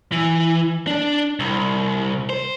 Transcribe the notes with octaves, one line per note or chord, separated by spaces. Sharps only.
E3
D4
C2
C5